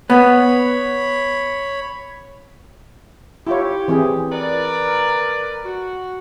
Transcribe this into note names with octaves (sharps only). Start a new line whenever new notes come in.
B3 C#5 B5
E4 F4 G4 C#5
E3 C4 G#4
A#4 B4 D5
F#4